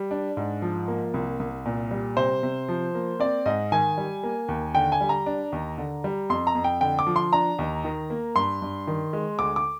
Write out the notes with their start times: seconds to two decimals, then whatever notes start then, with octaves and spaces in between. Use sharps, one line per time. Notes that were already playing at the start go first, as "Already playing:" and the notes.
Already playing: G3
0.11 D4
0.37 G#2
0.62 F3
0.88 A#3
1.14 C2
1.40 C2
1.66 A#2
1.91 G3
2.17 C3 C5
2.43 C3
2.69 F3
2.95 A#3
3.20 C4 D5
3.46 G#2 D#5
3.72 D#3 G#5
3.98 G3
4.23 A#3
4.48 D#2
4.74 D3 G5
4.92 G#5
5.01 G3
5.09 A#5
5.26 D4
5.52 D#2
5.78 D3
6.04 G3
6.30 F2 C6
6.47 A#5
6.55 F2
6.64 G5
6.81 D3 G5
6.99 D6
7.07 F3
7.16 C6
7.33 D4 A#5
7.59 D#2
7.84 D#3
8.10 A#3
8.36 G2 C6
8.62 G2
8.87 D#3
9.13 G#3
9.39 D2 D6
9.56 D6